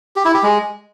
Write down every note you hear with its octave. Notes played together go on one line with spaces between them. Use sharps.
G4
E4
G4
G#3